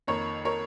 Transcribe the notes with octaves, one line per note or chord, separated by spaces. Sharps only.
F2 D#3 A#3 A#4 C#5
A#4 C#5